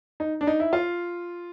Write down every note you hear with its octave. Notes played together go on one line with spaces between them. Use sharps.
D#4
D4
D#4
E4
F4